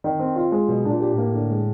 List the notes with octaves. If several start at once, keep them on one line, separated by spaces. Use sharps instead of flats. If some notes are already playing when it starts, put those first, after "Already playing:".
D#3
C4
F4
G#3
B2 F#3
A2 D4
A#2
G4
A2
A#3
D3
G#3